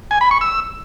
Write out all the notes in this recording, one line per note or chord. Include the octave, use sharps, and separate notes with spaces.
G#5
B5
C#6
E6